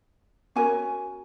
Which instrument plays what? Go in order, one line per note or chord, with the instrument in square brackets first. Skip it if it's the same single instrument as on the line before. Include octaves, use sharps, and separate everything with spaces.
[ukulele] C#4 F#4 A#4 G#5